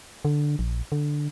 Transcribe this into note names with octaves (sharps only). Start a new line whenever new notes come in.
D3
A#1
D3